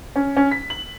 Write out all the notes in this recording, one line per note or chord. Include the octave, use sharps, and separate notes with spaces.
C#4
C#4
B6
F#7